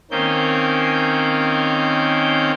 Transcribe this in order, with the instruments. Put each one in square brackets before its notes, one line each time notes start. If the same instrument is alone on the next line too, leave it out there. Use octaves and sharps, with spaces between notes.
[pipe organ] D#3 A#3 C4 C#4 G6